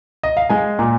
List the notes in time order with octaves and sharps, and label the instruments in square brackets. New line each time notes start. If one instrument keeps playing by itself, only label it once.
[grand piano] D#5
F5
G#3 G#5
A#2